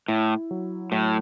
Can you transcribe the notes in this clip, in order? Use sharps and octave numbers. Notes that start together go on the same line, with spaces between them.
A2 E4
F#3
A2 F#3